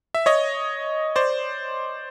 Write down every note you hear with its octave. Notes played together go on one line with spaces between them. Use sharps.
E5
C#5 D#5
C5 D5